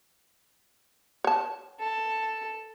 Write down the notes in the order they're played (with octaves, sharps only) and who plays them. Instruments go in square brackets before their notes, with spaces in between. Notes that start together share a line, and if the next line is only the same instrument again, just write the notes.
[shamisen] C#5 A5
[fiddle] A4